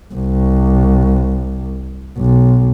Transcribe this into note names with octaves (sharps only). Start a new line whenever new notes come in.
C2
B1